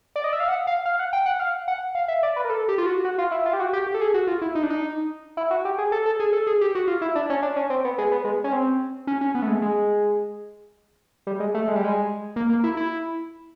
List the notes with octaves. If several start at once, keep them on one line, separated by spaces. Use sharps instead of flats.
D5
D#5
E5
F5
F#5
F5
F5
F#5
G5
F#5
F5
F#5
F5
E5
D5
B4
A#4
A4
G4
F4
F#4
F#4
F4
E4
F4
G4
F#4
G4
G4
A4
G#4
F#4
F4
E4
D#4
D4
D#4
E4
F#4
G4
G#4
A4
A4
G#4
A4
G#4
G4
F#4
F4
E4
D4
C#4
D4
C#4
C4
B3
G#3
B3
G#3
C#4
C4
C#4
C#4
B3
A3
G#3
G#3
G3
G#3
A3
G#3
G3
G#3
A#3
A#3
E4
E4